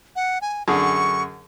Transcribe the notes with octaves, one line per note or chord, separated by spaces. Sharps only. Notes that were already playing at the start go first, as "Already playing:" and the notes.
F#5
G#5
F#2 D3 G#4 C#6